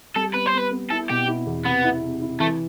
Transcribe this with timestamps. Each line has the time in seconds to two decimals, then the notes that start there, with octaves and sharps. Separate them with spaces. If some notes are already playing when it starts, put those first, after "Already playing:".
0.16 G3 A4
0.34 B3 B4
0.47 C5
0.53 B3 B4
0.71 B3
0.91 E4 A4
1.09 B2 G4
1.28 E4
1.47 E2
1.65 C3 B3
1.84 E4
2.02 C3
2.21 E4
2.40 E3 A3